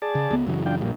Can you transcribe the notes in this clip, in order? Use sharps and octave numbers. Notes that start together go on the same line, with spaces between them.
G#4 D5 A5
C#3
C#2 B3
F#2 C#3 E3 F#3
D4 F4 G5
A#1 F2 A#2 G3